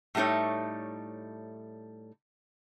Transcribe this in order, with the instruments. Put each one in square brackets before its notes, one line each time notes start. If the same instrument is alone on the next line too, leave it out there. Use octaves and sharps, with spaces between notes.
[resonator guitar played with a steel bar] A2 G3 A3 D#4 C#5